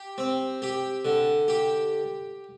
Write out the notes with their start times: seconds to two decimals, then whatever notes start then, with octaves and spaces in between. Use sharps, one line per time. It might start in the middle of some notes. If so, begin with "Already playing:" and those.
Already playing: G4
0.18 C4
0.62 G4
1.05 D3
1.48 G4